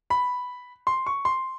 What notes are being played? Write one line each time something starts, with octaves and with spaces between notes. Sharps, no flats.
B5
C6
C#6
C6